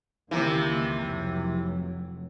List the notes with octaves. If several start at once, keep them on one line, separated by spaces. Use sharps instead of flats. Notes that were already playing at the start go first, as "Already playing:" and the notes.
C#2 C3 D#3 E3 A#3
F1 F#3